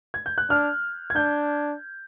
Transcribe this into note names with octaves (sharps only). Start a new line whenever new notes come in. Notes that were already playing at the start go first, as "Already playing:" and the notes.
G#6
G6
F#6
D4 F6
G#6
D4 G6